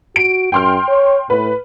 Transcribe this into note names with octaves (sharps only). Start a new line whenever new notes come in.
F#4 D7
F#2 G5 C6 F6
C#5
A2 B4